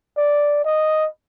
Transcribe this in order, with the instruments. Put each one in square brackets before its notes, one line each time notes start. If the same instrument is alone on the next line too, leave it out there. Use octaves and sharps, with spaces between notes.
[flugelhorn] D5
D#5